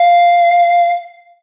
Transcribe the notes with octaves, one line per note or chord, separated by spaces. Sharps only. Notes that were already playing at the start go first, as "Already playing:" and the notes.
Already playing: F5